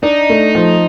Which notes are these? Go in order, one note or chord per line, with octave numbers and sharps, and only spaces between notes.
D4 D#4
A3
F3